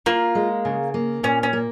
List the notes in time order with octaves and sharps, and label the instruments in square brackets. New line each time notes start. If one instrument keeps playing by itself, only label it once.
[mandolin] A#3 [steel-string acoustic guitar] F4
[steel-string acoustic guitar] G#3
C#3
A#3
[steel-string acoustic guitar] A#2 [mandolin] C#4
[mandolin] C#4
[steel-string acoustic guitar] A#3